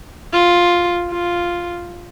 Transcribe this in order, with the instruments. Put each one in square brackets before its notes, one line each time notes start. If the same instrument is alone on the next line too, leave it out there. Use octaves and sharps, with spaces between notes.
[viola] F4
F4